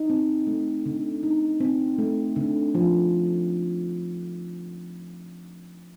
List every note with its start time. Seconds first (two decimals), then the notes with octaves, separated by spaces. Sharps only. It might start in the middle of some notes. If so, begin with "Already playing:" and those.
Already playing: D#4
0.10 C4
0.47 A3
0.86 D3
1.23 D#4
1.60 C4
1.98 A3
2.36 D3
2.75 F3